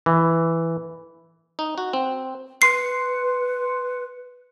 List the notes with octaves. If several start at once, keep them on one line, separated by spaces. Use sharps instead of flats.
E3
D#4
F#4
C4
B4 C6 C7 C#7